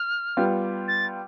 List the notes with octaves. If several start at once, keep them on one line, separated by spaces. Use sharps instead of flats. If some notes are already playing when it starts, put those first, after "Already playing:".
Already playing: F6
G3 B3 F4
A6